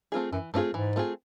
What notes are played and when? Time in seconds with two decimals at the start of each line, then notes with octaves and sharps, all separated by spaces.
0.12 A3 C4 F4 G#4
0.32 F#2 E3
0.54 G2 A3 C4 F4 G#4
0.74 G#2 E3
0.96 A3 C4 F4 G#4